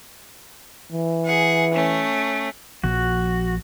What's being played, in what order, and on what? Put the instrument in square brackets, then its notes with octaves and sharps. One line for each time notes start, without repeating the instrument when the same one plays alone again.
[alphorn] E3
[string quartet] G#4 F#5
A3 C#4
[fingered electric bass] A#1 F3 [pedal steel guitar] F#4